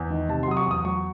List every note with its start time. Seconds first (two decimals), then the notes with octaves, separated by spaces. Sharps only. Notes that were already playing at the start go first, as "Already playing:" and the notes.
Already playing: E2
0.10 D#3
0.29 C3 A5
0.43 C6
0.48 F#3 D#6
0.57 C#6
0.66 E2 D#6
0.85 F#3 C#6